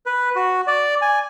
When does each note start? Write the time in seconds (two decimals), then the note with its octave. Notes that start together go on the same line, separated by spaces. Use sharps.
0.06 B4
0.36 F#4
0.67 D5
1.02 G#5